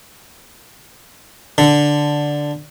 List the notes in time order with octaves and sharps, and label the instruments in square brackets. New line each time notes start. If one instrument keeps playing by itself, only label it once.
[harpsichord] D3